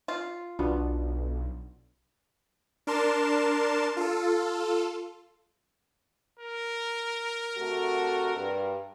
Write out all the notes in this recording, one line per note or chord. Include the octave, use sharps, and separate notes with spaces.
F4
B1 B3 D4 F4 F#4
D4 A#4 A5 C6 E7
F4 A4
A#4
C3 A3 F#4
G2